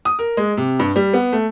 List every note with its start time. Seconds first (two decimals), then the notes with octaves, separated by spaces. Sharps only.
0.05 D#6
0.19 A#4
0.37 G#3
0.57 C3
0.79 G2
0.96 G3
1.13 B3
1.33 A3